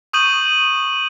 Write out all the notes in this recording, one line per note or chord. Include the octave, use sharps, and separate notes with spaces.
C#6 D#6 G6 D#7 F#7